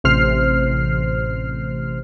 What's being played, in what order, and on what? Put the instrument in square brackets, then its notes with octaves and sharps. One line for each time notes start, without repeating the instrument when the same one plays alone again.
[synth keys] A1 C3 C5 F6 C7